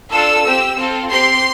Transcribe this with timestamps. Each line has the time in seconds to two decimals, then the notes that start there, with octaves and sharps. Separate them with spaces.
0.12 D4 F4 A4 E6
0.44 C4 G4
0.77 C4 F4 A4
1.11 C4 G4 C6